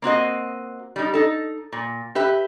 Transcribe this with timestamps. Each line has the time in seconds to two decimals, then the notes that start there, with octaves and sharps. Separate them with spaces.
0.02 A#3 C4 F#4 D#5
0.96 G3 D#4
1.14 D#4 A4
1.73 A#2
2.15 G4 B4 E5